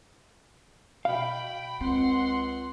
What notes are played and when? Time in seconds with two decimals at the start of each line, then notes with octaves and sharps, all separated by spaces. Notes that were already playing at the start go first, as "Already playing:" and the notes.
1.05 B2 F5 G5 B5
1.81 C#2 C4 F#5 C6